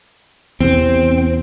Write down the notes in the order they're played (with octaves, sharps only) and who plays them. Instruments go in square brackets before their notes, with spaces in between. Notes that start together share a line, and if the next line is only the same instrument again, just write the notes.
[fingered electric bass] E2 C3 [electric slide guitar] C4